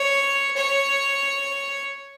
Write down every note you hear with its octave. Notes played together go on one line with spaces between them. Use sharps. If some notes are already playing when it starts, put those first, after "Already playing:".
Already playing: C#5
C#5